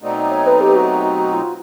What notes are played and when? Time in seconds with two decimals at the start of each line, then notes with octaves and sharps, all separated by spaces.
0.02 B2 F#3 A3 C4 D#4 D5
0.17 D5
0.31 C#5
0.46 B4
0.59 G4
0.75 F#4
1.33 F4